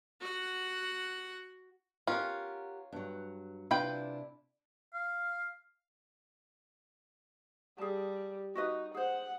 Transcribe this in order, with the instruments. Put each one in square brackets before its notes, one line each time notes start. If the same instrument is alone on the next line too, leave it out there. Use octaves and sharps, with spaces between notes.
[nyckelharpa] F#4 F#5
[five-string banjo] C#4 F4 [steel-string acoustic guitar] G4 A#4 F#5
[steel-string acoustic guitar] G2 F#3
[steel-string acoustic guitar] C3 D4 E4 [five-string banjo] F4 B4 G5
[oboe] F5
[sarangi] G3 [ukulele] G#4 A5
[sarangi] D#4 [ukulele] F#4 B4 D#5
[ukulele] G#4 C5 [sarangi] F#5